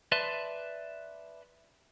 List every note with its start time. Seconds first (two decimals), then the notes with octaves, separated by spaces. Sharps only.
0.12 B4 D5 E5 A5 C6